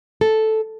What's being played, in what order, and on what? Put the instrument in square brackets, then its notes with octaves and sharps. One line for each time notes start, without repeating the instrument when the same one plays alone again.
[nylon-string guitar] A4